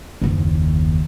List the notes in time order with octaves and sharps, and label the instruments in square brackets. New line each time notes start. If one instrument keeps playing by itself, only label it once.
[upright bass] F#1 D#2